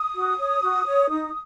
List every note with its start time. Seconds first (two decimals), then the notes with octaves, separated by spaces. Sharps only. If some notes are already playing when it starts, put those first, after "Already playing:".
Already playing: D#6
0.15 F#4
0.39 C#5
0.63 F#4
0.86 C#5
1.10 D#4